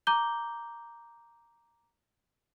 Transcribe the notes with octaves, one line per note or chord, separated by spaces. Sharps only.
A#5 D6 G6 G7